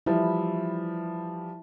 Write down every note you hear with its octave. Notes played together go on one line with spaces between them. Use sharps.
E3 F3 G3 E4